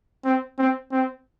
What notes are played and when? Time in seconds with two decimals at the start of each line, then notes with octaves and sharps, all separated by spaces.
0.25 C4
0.58 C4
0.92 C4